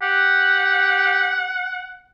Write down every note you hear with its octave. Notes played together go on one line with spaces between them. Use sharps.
G4 F#5